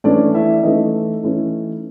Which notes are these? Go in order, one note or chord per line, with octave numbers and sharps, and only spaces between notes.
E3 A3 C#4 D4 E4 D5
E4 E5
E5
E3 A3 C#4 D#4 E4 D#5
E3 A3 C#4 E4